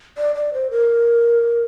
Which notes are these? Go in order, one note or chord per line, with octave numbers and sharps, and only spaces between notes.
D5
D5
C5
A#4